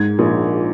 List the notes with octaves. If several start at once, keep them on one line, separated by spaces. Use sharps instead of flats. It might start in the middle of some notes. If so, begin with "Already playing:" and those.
Already playing: G#2 G#6
A#1